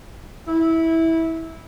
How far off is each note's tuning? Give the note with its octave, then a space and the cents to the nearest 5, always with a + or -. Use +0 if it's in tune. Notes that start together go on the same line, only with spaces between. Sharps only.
E4 -15